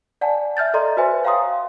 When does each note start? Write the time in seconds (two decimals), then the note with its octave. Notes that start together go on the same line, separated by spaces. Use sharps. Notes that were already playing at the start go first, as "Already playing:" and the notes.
0.21 D5 F#5 G#5 A5
0.57 E5 F6 G6 A6
0.74 A4 D5 D#5 A#5 C6
0.97 F#4 B4 C5 E5 G#5
1.24 C#5 F5 G5 A#5 C6 D#6